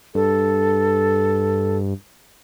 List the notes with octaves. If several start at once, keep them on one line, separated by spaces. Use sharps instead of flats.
G2 A4